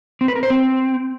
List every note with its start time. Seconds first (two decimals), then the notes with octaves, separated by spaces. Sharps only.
0.21 C4
0.28 B4
0.36 A#4
0.43 C5
0.50 C4